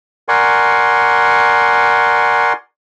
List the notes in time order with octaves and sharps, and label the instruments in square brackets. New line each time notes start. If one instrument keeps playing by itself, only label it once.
[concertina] A#4 D5 F#5 G#5 C6 C#6